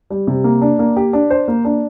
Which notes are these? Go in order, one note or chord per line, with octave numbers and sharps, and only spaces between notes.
G3
C3
A#3
D4
A#3
G4
D4
C5
A#3
D4